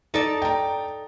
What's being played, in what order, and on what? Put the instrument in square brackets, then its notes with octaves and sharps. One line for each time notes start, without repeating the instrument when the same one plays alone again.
[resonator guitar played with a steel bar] D#4 A4 D5 [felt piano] A#5
[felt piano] G5 A#5